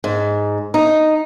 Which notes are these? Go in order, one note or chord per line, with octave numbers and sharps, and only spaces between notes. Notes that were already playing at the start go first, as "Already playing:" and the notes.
G#2
D#4